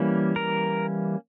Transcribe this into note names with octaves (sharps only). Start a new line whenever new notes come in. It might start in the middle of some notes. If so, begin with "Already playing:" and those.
Already playing: E3 G3 A#3 C#4
A#4